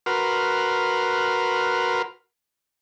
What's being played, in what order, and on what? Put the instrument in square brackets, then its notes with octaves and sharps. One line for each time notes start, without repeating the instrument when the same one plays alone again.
[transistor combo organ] F#4 A#4 B4 C6 F6